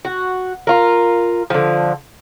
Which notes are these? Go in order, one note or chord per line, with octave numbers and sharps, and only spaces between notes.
F#4
F4 A#4
D3 F3